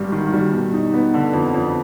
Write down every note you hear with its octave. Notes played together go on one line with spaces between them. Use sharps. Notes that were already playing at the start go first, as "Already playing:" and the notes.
Already playing: G#1 G2 G3
D#3
G3
B2
D#4
B3
D3
F2
F2